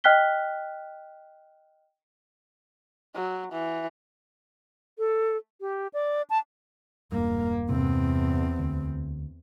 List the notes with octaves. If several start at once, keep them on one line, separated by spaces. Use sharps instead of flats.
D#5 G5 F6 F#6 B6 G7
F#3
E3
A4
G4
D5
A5
E1 G2 A#3
E2 G2 C3 C4
D2